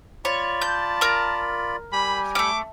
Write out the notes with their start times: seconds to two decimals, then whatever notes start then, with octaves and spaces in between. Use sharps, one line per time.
0.25 F4 C#5 D5 B5
0.62 A5 G6
1.01 A#4 A#5
1.93 G3 G4 G#5 B5
2.35 A3 C#4 D6